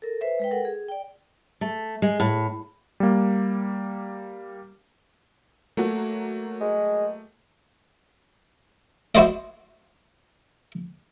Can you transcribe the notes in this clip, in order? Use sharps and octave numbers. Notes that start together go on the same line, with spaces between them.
A4 A#4
B4 C5 E5
G#3 B4 G5
A4 A#4 F#5
G#4
D5 G5
A3
G#3
A2
G3 A#3
F#3 A3 A#3 F#4
G#3
E4 F#4 C5 D5 D#5